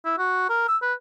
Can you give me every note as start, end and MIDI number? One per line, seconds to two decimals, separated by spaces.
0.05 0.16 64
0.18 0.47 66
0.49 0.65 70
0.68 0.77 88
0.82 0.93 71